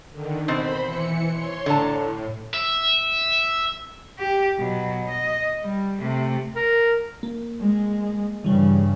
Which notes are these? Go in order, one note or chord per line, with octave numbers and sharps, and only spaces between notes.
D3 D#3
B2 C4 C5 B5
E3 C#7
C#5 C6
A2 D3 A5
E5
G4
B2 F#3
D#5
G3
C3 A3
A#4
A#3
G#3
G2 C#3 E3 G3